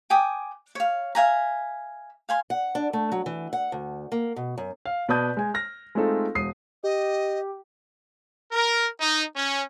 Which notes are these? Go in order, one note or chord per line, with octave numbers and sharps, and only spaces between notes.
G5 G#5 D6 D#6
C#5 F5
E5 F5 G#5 A#5
F5 G#5 C6
F#5
D4
A3
F#3
E3
F#5
D2
A#3
B2
F#2
F5
B2 B4 D5 A5 D#6 G6
G#3 G#5
F6 A#6
G#3 A3 C4 D#4 F4 A4
E1 D#6 C7
G4 D#5
A#4
D#4
C#4